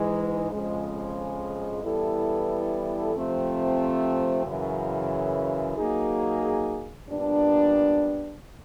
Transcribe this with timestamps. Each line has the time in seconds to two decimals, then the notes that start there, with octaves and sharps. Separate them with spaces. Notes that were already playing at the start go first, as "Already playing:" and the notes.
Already playing: G#2 E3 G#3
0.51 F2 C#3 F3 G#3
1.82 E3 G3 B3 E4 A4
3.13 C3 F3 A3 C4
4.44 F#2 C#3 E3
5.76 F#3 A#3 D#4 G#4
7.07 A#2 G3 B3 D4